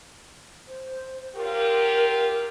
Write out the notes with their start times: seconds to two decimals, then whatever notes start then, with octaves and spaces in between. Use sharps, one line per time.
0.68 C5
1.35 F#3 F4 G4 A#4